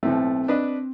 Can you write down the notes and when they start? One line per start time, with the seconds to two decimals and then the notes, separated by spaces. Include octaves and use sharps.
0.03 B1 A2 A3 C4
0.48 D4 B4 D#5